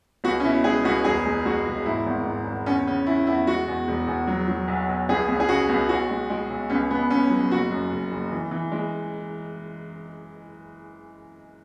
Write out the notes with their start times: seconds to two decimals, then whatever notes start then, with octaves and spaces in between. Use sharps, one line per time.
0.24 C#2 F#4
0.40 C#4
0.44 B2 E4
0.64 G#3 G#4
0.85 C#2 F#4
1.05 E1 G#4
1.25 G#3
1.45 G#3 F#4
1.66 E1
1.86 G#2 E4
2.06 G#1
2.26 G#2
2.47 G#1
2.66 E2 C#4
2.87 C#3 C#4
3.07 C#3 E4
3.27 E2 E4
3.47 G#3 F#4
3.68 E2
3.88 E1
4.07 E2
4.27 F#3
4.48 F#3
4.68 B1
4.89 B1
5.09 C#2 G#4
5.28 C#2
5.40 G#4
5.49 C#3 F#4
5.69 C#2
5.89 B1 F#4
6.10 G#3
6.30 G#3
6.50 B1
6.70 C#2 C#4
6.90 C#2 B3
7.10 C#2 C#4
7.30 F#3
7.51 F#1 F#4
7.70 F#2
7.91 F#1
8.11 F#1
8.32 E3
8.51 E3
8.72 G#3